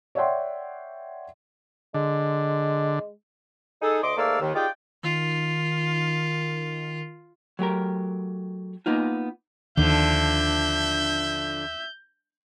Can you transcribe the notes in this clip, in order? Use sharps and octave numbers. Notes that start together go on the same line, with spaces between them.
C#5 D5 E5 F#5 G5 C6
D3 G#3
D#4 G#4 A4
D2 D#5 C6 D6
G#2 A3 A#3 D5 F5 E6
D#2 D#3
D#4 F4 G4 G#4 D5 G5
D#3 F4
F#3 A3 G4 A#4
A#3 B3 D#4 F4
D#2 D3 D#3 F3 E5 G6